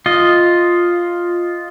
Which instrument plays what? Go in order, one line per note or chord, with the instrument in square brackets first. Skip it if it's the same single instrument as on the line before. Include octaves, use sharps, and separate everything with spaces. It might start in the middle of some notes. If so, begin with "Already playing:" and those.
[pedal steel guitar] F4 D#5